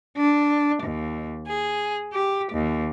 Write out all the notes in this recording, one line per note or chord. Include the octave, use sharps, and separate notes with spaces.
D4
D#2
G#4
G4
D#2